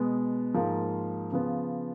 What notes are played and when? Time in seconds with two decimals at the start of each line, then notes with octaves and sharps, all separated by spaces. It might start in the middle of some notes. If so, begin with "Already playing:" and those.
Already playing: B2 G#3 B3
0.54 G#2 F3 A#3
1.32 C#3 F3 B3